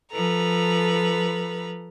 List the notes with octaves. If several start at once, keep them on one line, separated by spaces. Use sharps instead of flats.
F3 A4 B4 A#5